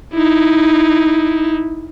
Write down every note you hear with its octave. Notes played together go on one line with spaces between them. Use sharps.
D#4 E4